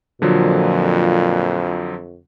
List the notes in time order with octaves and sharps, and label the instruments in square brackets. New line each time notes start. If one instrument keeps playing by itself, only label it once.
[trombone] F2 [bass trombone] A#2 [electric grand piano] D3 F3 F#3